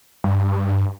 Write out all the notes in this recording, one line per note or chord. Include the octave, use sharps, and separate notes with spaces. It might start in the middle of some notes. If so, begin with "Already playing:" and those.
G2